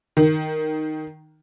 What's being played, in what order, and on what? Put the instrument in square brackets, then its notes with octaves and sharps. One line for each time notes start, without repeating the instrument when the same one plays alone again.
[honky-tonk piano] D#3